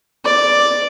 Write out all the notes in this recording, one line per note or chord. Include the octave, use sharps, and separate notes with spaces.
D5